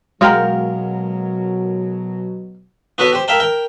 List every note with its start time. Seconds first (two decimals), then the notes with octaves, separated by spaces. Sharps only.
0.21 B2 F#3 G#3 F#4 A#4 F5 G5
2.98 B3 F#4 A4 B4 C#5
3.13 G4 C5
3.28 A#4 E5 F5 G5 A5
3.40 A#4 G5